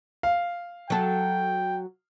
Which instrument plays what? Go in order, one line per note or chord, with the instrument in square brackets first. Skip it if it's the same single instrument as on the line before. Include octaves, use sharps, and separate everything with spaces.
[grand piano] F5
[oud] F#3 A4 [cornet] G5